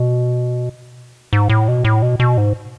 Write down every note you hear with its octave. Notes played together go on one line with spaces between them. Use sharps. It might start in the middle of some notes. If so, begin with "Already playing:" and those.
Already playing: B2
G#2
A2
B2
A2
B2
B2
G#2